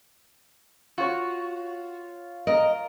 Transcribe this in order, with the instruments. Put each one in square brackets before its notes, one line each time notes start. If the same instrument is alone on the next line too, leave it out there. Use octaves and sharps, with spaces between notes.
[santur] F4 C#5 C#6 [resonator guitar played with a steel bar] F#4
[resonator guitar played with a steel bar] A#4 [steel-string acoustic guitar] D#5